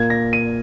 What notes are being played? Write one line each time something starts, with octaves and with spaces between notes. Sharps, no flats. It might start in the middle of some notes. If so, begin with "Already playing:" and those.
Already playing: A#2 A#3 G#6
A#6
D#7